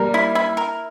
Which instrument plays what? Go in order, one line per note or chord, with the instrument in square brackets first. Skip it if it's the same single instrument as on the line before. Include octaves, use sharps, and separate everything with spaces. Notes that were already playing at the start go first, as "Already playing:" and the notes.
Already playing: [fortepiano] G3 A#3 [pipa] A#4
[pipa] E4
E4
A#4